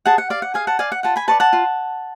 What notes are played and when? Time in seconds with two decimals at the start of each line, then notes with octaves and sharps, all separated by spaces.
0.06 G#4 F#5 A5
0.18 F#5
0.30 D5 F5
0.42 F#5
0.54 G#4 F5 G#5
0.67 F#5 A5
0.79 D5 F5 G#5
0.92 F#5
1.03 F4 F#5 A5
1.16 G#5 B5
1.28 B4 D5 A5 C#6
1.40 F#5 A5
1.53 F4